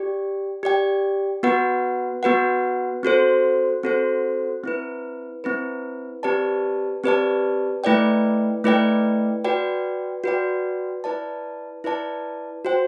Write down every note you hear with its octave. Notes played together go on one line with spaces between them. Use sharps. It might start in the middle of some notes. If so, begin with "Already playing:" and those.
Already playing: G4 D5 G5
G4 D5 G5
B3 F#4 B4 F#5
B3 F#4 B4 F#5
C4 F#4 A4 C5
C4 F#4 A4 C5
C4 E4 B4
C4 E4 B4
C4 G4 B4 D5 A5
C4 G4 B4 D5 A5
A3 E4 B4 D5 G5
A3 E4 B4 D5 G5
F#4 B4 D5 G5
F#4 B4 D5 G5
E4 B4 D5 A5
E4 B4 D5 A5
F#4 C5 G5